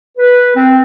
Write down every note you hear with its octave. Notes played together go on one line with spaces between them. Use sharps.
B4
C4